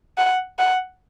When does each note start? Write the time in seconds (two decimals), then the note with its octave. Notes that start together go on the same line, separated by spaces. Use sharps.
0.17 F#5
0.58 F#5